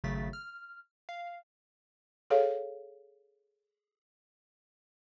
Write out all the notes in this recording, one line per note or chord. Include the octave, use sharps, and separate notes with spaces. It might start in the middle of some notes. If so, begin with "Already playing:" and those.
G#1 C#3 F#3 A3 A6 B6
F6
F5
G#4 A4 C#5 F5